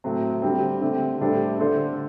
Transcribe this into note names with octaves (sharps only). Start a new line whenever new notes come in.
A2 F#3 C4
D3 G3 C4
D3 A3 C4 G4
A2 G3 D4 A4 C5
D3 A3 D4 A4 C5